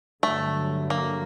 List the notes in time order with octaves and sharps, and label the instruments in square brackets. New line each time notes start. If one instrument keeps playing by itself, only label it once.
[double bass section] G2 D3 F#3 [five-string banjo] A3
[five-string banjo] A#3